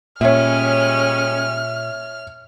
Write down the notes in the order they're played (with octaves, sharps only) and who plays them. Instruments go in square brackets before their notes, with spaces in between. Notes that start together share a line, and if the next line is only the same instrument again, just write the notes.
[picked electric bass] A#2 [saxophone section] G3 G#3 C#4 [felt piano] C#5 E5 [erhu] F6